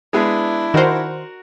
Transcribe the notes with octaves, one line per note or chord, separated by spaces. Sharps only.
G#3 B3 D4 E4 G#4
D#3 F#4 A#4 C5 F#5